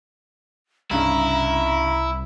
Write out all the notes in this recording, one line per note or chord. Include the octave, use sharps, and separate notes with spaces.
C2 G2 C#3 D#4 E4 A#5